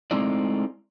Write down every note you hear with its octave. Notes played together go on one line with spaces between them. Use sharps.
G#3 A3 C4 D#4 E4 D5